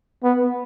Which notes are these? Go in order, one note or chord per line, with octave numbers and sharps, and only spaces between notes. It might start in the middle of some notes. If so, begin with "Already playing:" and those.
B3